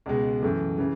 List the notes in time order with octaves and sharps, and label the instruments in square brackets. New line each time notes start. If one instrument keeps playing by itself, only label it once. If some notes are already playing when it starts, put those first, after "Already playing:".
[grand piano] C#2 B2 G#3
F#2 E3 A3
C#3 E3